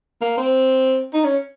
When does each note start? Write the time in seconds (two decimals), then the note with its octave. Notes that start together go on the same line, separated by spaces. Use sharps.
0.21 A#3
0.37 C4
1.13 D#4
1.24 C#4